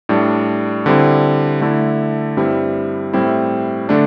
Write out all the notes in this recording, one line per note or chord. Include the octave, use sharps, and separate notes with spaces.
A2 G3 D4
D3 G3 C4 E4
D3 A3 E4
G2 G3 C4 E4
A2 G3 C4 E4
D3 A3 D4